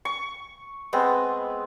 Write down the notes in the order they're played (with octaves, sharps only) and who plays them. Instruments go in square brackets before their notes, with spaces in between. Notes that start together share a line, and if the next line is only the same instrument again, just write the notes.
[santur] C#6
G#3 B3 C4